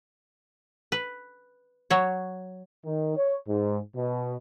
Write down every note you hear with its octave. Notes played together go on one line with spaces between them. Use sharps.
B4
F#3 C#5
D#3
C#5
G#2
B2